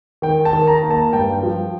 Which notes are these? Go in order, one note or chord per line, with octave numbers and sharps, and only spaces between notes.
D#3 G5
A5
D#3
A#5
A#3
A5
G2 G5
F3